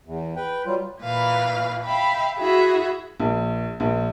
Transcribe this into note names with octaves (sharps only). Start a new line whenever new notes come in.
E2
B4 G5
F#3 G3 F4
A#2 E3 B4 F5
E5 F5 G5 B5
E4 F#4 G#4 E5
A#1
A#1